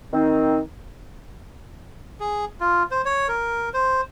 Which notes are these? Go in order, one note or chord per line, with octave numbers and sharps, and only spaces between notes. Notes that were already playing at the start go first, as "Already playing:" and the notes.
D#3 C4 D#4
G#4
F4
C5
C#5
A#4
C5